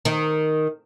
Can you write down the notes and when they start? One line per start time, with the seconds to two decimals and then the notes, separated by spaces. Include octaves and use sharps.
0.05 D#3